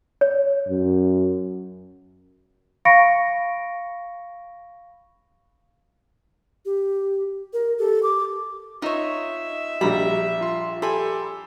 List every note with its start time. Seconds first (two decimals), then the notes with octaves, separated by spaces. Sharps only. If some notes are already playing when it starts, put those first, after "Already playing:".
0.21 C#5
0.69 F#2
2.85 F5 B5 C#6 A#6 C#7 D7
6.65 G4
7.53 A#4
7.79 G4 A4
8.03 D6
8.82 D#4 F4 C#5 D#5 E5
9.81 A#1 G3 A#5 B5
10.41 F4 C6
10.82 G4 A4 G#5 B5 C6